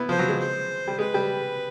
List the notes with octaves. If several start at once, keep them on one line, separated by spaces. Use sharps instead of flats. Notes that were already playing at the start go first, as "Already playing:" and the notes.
Already playing: B3 E4
F3 C5
F#3
G#3
C5
G3
G#3 B4
G3